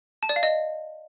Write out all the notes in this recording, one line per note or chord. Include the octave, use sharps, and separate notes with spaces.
A5
D5
F5
D#5